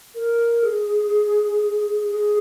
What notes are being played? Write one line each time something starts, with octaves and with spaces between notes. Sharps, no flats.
A#4
G#4
G#4